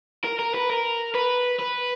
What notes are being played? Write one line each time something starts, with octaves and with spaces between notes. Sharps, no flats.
A#4
A#4
B4
A#4
B4
B4